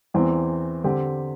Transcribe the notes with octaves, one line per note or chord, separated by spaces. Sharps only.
E2 E3 C4
D3 C4 G4